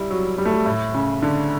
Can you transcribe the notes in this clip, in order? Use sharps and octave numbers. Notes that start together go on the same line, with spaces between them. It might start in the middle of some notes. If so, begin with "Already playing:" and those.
Already playing: G3 E4
F#3
G3
A3
G3
A2
C#3
D3